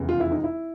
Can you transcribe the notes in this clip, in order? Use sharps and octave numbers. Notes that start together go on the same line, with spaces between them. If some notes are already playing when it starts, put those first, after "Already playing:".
Already playing: F1 E2 C#3 E3
F4
E4
D#4
E4